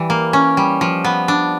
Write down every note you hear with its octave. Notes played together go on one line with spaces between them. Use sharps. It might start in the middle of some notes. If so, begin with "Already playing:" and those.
Already playing: E3 G3
A#3
C#4
G3
F3
B3
D4